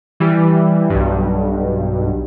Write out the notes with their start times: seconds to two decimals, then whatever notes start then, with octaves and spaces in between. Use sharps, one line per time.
0.20 E3 G3
0.90 B1 G2